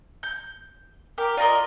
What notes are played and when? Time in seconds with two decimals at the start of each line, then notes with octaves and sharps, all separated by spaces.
0.23 G6
1.18 G4 A#4 D6
1.37 F4 A#4 D5 D#5